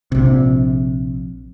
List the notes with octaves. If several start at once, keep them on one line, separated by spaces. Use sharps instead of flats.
A#1 C3